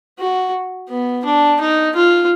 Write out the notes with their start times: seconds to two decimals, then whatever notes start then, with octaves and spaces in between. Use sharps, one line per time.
0.19 F#4
0.89 B3
1.25 D4
1.60 D#4
1.95 F4